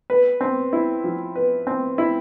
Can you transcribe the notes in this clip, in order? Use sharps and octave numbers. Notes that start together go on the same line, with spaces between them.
B4
C4
E4
F3
B4
C4
E4